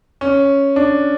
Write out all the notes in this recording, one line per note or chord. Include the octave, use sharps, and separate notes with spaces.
C#4
D4